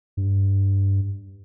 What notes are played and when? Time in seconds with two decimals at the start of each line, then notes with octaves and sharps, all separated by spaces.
0.17 G2